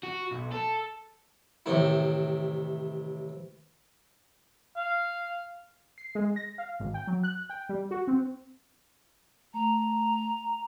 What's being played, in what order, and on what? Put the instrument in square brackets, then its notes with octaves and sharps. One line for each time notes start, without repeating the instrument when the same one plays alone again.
[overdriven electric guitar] F#4
B1
A4
[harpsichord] A1 C3 D#3 E4
[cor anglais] F5
[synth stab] C7
G#3
A#6
F5
G#1
G5
F#3
F#6
G5
G3
F#4
C4
[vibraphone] A3 [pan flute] A#5